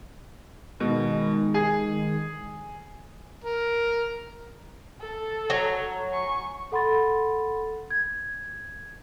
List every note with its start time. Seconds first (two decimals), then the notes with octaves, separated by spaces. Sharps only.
0.80 B2 D#3 G#3
1.54 G#4
3.44 A#4
5.01 A4
5.50 F#3
6.11 G#5 C#6
6.72 A4 F#5 B5 C6 A6
7.90 G#6